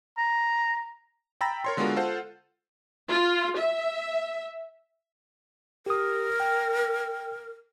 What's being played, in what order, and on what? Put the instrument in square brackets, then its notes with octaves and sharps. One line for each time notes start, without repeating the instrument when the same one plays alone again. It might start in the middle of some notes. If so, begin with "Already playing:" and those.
[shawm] A#5
[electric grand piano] G5 A#5 B5 E6 A6 A#6
A#4 C#5 C6
D3 G#3 B3 F4 F#4 A#4
F4 A4 C5 F#5
[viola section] F4
E5
[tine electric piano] G4 D#6 [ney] A#4
[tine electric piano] G5